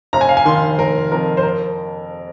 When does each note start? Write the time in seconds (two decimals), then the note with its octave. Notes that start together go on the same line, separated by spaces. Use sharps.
0.13 F1 A#5
0.21 G#5
0.29 F5
0.37 G#5
0.45 D#3 C6
0.78 F1 A#4
1.12 F2 A#4
1.37 C5
1.43 A#4